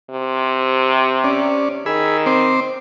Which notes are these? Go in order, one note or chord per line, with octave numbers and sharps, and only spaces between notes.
C3
C#4 D5
D#3 G#4 B5 E6
C4 C5 D6